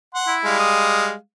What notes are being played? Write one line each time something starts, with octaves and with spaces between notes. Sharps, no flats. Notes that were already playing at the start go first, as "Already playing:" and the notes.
F#5 C6
E4
G3 G#3 F5
D#6